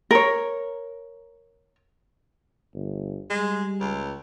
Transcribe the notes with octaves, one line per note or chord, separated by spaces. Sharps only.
A#4 C#5
G1
G3 G#3
C#2